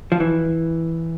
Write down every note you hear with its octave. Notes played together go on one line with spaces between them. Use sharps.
F3
E3